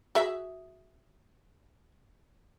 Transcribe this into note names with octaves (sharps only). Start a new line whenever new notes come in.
F#4 G#4 E5